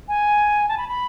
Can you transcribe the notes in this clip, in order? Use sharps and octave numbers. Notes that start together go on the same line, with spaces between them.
G#5
A5
B5
B5